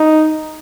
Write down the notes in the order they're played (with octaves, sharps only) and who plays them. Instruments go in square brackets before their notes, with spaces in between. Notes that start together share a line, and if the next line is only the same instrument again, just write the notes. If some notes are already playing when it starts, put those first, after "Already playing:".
Already playing: [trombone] D#4